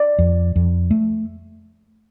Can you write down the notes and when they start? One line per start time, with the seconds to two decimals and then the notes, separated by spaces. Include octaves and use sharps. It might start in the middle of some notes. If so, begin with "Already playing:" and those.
Already playing: D5
0.19 F2
0.56 F2
0.91 A3